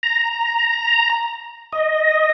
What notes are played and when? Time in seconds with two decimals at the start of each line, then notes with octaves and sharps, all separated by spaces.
0.03 A#5
1.73 D#5